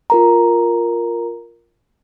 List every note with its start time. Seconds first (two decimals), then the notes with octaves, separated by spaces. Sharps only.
0.10 F4 A#4 A#5